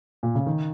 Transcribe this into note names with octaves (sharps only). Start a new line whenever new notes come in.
A#2
C#3
D#3